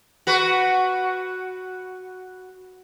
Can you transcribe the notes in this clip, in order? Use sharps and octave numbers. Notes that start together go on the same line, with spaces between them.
F#4 B4